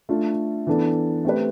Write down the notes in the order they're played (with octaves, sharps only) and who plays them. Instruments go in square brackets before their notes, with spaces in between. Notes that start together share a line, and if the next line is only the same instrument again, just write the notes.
[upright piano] A3 D4 F4 A4
E3 B3 D4 A4
A3 C4 G4 B4